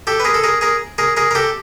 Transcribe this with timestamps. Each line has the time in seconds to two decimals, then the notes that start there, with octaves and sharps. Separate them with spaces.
0.07 G4 A4
0.20 B4
0.25 G#4 A#4
0.34 A4
0.43 G#4 A#4
0.61 G#4 A#4
0.98 G#4 A#4
1.17 G#4 A#4
1.31 A#4
1.35 G4 A4